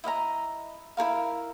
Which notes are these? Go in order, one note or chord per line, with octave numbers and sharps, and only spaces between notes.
E4 D#5 F5 A#5
E4 G#4 A#4 F5